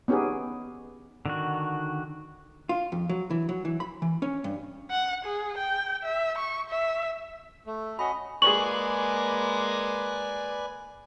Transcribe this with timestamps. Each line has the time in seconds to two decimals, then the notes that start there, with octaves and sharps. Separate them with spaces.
0.08 B3 C#4 D#4 G4 G#4
1.26 D3 D#3 F#4
2.69 F4
2.92 F2
3.09 F#3
3.30 E3
3.49 F#3
3.65 E3
3.80 B5
4.02 E3
4.22 C#4
4.44 G2
4.91 F#5
5.25 G#4
5.58 G5
6.03 E5
6.38 C#6
6.70 E5
7.66 A3
7.99 C#4 F#4 D#5 B5
8.42 G#3 A#3 G#4 B4 D5 G#5 C#6 F#7